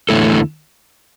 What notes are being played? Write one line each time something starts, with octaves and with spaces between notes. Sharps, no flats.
E2 D3 A3 E4 A4